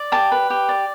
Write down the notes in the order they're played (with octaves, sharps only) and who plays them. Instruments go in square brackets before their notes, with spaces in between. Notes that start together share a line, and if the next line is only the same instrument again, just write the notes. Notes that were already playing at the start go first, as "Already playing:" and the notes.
Already playing: [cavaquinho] D5
G4 A5
B4
G4
D5